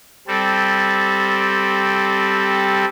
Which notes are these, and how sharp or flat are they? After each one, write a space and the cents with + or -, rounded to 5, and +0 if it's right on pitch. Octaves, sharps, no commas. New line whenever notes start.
G3 +0 C4 +0 A4 -5